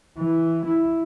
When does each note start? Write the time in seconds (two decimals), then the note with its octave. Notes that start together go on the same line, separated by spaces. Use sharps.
0.18 E3
0.66 E4